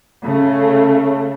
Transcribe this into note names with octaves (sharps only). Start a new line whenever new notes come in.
C#3 A3